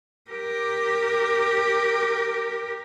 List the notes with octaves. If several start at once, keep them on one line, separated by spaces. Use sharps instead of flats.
G4 A#4